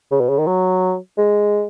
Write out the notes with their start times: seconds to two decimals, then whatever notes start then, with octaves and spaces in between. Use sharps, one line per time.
0.11 C#3
0.20 B2
0.29 C#3
0.38 D#3
0.47 F#3
1.18 G#3